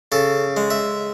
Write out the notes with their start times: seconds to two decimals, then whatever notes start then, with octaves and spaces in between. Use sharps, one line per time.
0.12 C#3 A4
0.57 G#3
0.70 E5